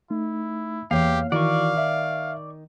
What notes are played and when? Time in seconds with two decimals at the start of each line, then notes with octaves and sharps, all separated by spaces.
0.10 A3 D#4 E4
0.91 E2 A#3 G4 C#5 F5
1.32 D#3 E3 E4 F#4 D5 F5 C#6
1.78 E5